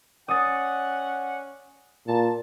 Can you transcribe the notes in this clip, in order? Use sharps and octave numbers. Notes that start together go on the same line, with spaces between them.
C#4 D5 F#5 D#6 A6
A#2 A5